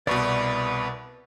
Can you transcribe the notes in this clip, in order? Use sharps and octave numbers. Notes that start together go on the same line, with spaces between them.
C2 B2 B4 D5 C#6